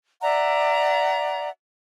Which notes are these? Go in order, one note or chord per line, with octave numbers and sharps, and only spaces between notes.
D5 E5 F#5 A#5